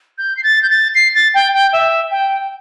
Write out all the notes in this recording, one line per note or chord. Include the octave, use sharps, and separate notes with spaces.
G6
C7
A6
G6
A6
C7
A6
G5
G5
E5
G5